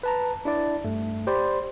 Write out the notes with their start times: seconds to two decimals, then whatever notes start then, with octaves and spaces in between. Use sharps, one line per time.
0.03 B4 A5 A#5
0.45 D4 E4 D5
0.84 G2 A3
1.27 G4 C5 D5 B5 C6